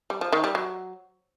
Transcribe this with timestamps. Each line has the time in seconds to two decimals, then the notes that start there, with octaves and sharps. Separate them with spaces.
0.10 G3
0.21 F3
0.32 D#3
0.44 G3
0.55 F#3